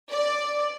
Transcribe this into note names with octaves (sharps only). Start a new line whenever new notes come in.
D5